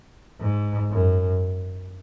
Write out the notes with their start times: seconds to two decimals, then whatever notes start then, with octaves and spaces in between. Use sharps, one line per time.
0.40 G#2
0.91 F#2